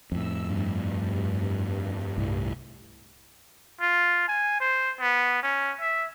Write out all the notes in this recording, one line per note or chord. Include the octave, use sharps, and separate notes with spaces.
F2 A2 E6
G2
C2 A2
F4
G#5
C5
B3
C#4
E5